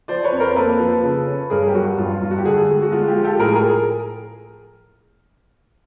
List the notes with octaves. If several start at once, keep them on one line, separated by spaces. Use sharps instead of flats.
F3 C5 D5
B4 C#5
F2
A#4 C5
A#3 A4 B4
F3
C#3
C#4
G2 G#4 A#4
G4
F#3 F#4
G2 F4
G2 F4
F#4
G4
D3 F#4 G#4
G#3
F#4
G#3 F4
F4 G4
F3
G4 A4
A2 G#4 A#4
G#4 A#4